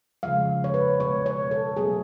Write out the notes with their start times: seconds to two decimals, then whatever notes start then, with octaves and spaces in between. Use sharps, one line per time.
0.23 C#3 F3 G#3 F5
0.64 C#5
0.74 B4
1.00 B2 G#3 C#5
1.26 C#5
1.51 A4
1.76 B2 F#3 A3 G#4